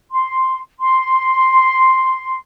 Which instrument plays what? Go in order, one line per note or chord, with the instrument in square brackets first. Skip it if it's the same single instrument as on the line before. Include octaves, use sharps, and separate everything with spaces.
[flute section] C6
C6